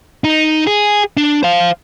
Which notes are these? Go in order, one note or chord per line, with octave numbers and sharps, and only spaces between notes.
D#4
G#4
D4
C5 F5